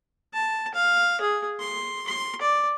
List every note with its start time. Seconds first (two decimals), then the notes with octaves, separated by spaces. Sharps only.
0.34 A5
0.74 F5
1.21 G#4
1.60 C6
2.08 C6
2.42 D5